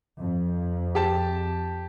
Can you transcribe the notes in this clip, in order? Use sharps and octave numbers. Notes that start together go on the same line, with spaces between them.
F2
G4 A5